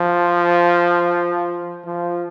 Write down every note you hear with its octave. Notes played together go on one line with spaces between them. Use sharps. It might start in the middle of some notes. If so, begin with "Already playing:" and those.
Already playing: F3
F3